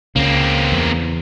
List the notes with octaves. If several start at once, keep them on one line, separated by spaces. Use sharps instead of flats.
C#2 C#3 A#3 C4
E2